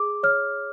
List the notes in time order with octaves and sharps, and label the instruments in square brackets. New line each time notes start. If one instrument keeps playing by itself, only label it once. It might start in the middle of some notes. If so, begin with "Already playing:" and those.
Already playing: [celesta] G#4 D6
C#5 F6